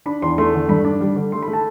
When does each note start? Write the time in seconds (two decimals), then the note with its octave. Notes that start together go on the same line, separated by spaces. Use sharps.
0.06 D4 B5
0.22 E2 C6
0.38 A3 C6
0.54 D3
0.69 G2 B5
0.85 D4
1.01 G3
1.16 D3
1.32 A3 C6
1.42 B5
1.48 A3
1.53 A5